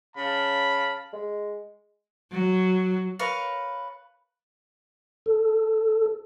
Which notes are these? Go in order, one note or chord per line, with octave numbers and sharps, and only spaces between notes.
C#3 F5 A5 B5
G#3
F#3
A#4 B4 C#5 F5
A4